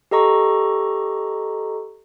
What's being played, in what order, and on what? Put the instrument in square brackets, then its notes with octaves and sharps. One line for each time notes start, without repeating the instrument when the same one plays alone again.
[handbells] G4 A4 D#5 A#5 C#6